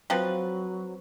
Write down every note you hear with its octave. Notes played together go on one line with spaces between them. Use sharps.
F3 F#3 C4 B4